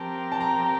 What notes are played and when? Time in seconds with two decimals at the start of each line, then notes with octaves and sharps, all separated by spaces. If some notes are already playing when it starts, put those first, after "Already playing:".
Already playing: F3 C4 G4 A#4 A5
0.32 A5
0.41 A#5